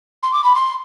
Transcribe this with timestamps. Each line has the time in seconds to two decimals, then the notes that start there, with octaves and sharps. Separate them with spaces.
0.23 C6
0.33 D6
0.44 B5
0.55 C6